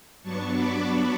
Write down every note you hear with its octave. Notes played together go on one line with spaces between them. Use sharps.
G2 F#3 B3 D4 A5 C#6
B5 D6
A5 C#6